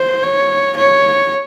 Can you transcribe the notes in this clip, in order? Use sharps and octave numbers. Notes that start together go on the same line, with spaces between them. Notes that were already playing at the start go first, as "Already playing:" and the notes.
Already playing: C5
C#5
C#5